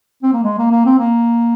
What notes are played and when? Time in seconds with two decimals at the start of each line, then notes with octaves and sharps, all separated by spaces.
0.23 C4
0.33 A#3
0.44 G#3
0.58 A#3
0.71 A#3
0.86 C4
0.98 A#3